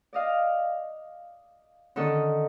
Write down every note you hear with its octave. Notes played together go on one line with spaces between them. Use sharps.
D5 D#5 F5
D3 D#3 C#4 A4 D#5